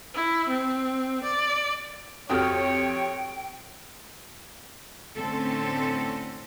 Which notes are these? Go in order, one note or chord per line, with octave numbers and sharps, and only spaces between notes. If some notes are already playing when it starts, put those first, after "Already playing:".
E4
C4
D5
F2 F#4 G4 A4 C#5 G5 D#6 F6
A2 D3 A3 C4 C#4 A4